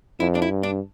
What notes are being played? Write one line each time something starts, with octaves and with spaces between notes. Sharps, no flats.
F2 E4
D4
E4
G2
D4